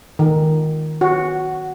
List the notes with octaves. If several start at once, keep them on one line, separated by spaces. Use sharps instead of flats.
D#3
F#4